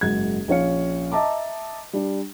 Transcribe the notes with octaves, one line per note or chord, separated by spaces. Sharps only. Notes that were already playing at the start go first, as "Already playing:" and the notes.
F#1 G#2 F#4 G#6
A#1 C#4 C#5 F5 C#7
D#5 E5 A5 A#5 D6
G3 D4